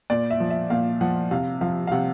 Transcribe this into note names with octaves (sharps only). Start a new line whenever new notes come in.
A#2 D5
E5
F3
E5
A#2 F5
F3 F#5
C3 F5
F3 F5
F5
C3 F#5